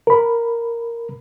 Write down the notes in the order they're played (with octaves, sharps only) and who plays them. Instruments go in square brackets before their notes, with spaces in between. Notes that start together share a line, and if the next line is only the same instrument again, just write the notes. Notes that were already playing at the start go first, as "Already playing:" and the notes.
[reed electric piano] A#4 B5